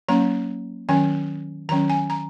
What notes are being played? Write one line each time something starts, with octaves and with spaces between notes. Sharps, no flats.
F#3 A#3 C#4 A#5
D#3 F#3 C#4 G#5
D#3 F#3 C#4 A#5
G#5
A#5